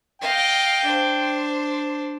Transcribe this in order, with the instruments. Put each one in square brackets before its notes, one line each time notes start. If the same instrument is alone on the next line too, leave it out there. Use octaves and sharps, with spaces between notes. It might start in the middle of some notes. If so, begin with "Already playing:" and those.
[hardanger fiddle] D#5 F5 [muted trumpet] G5
[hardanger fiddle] D4 C5